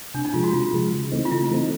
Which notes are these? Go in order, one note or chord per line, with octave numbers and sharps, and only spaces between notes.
C3 D4
D#4
F3 G#3 F4
F#4
C3 F4
F3 G#3
C#3
E3 A3 C4 D#4
F4
C#3 E4
E3 A3 C4 D#4